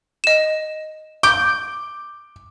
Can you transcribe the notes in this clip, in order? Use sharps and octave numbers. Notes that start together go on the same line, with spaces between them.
D#5 E7
D6 G6 D7 G7